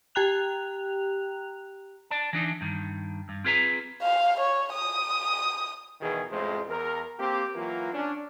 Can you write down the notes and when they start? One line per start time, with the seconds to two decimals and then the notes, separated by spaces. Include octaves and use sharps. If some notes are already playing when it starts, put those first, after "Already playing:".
0.15 G4 G5 A#5 F#6 F7
2.11 D5 A5
2.33 E3 D4 D#4
2.61 G2 D#3
3.29 G2
3.44 C4 F4 G#4 B4 E5 A#5
4.02 F5
4.40 C#5
4.74 D#6
6.01 E2 B2 D#3 E3 G#4
6.31 A1 F2 A2 G#3 C5
6.69 E2 A#4
7.20 A#3 C4 G4
7.55 E3 F#3 A#3 F4
7.94 C#4 D4